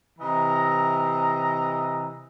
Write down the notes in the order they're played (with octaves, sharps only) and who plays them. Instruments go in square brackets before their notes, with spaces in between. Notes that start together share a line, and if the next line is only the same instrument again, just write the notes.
[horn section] C3 E3 D#5 E5 A#5